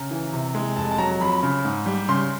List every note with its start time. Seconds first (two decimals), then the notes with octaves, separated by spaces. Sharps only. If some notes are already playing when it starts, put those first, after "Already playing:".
Already playing: C#3 A#5
0.11 E3
0.33 C3
0.55 G#3
0.76 F1 A5
0.91 A5
0.98 F#3 A#5
1.21 F2 B5
1.43 C#3
1.65 G#2
1.86 G3
2.09 C#3 C6